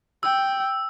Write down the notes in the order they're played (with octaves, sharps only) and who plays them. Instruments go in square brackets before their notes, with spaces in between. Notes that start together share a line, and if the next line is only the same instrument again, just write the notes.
[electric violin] G5 [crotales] E6